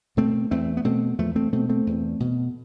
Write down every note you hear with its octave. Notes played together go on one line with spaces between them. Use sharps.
B2 A3 C4
E2 A3 C4
B3
B2 A3 C4
E2 F3 A3
A3 C4
B2 A3 C4
A3 C4
E2
B2